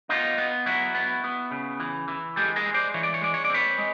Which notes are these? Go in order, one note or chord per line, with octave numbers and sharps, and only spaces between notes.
B3 D#4 F4
B3
F#3 E4 F#4
B3
B3
C#3
E3
E3
G#3 G4 A4
G#4 A#4
G#3
C5 D5
E3 C#5
D5
C#5
G#3 D5
C#5
D5
C4 B4 C#5
G#3